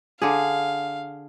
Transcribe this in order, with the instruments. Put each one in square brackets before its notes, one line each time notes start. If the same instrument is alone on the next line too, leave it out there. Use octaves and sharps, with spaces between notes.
[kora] D3 G#4 [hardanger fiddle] F5